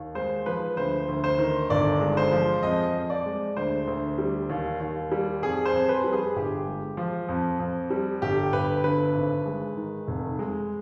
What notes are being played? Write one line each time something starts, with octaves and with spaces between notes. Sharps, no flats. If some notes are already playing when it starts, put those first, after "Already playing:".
Already playing: D#2
G#3 C5
F3 B4
D2 C5
D2
C5
D#3
G1 D5
G#3
C5
F3
F2 D#5
F2
D5
G#3
D2 C5
D2
G3
D#2
D#2
G3
F2 G#4
C5
F2
B4
G3
G#4
G1 G4
G#3
F3
F2
F2
G3
G1 G4
G1 B4
D3 B4
G#1
G#3
D#3
F1
G#3